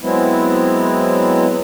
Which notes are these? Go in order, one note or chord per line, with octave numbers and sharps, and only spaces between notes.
F#3 G#3 B3 C4 E4